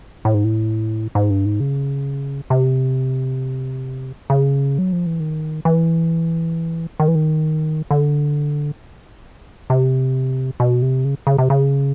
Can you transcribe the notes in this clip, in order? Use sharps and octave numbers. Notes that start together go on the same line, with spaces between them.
A2
G#2
A2
G#2
G2
G#2
C#3
C3
C#3
F#3
F3
E3
D#3
E3
D#3
E3
D#3
D3
C3
B2
C3
C#3
C#3
C3
C#3